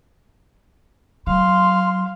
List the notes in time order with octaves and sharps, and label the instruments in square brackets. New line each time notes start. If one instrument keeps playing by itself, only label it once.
[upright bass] F#3 [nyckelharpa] F5 [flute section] C6